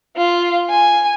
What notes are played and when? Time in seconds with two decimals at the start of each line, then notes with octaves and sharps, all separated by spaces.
0.17 F4
0.70 G#5